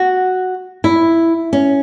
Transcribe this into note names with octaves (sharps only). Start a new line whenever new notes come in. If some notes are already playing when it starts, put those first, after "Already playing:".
Already playing: F#4
E4
C#4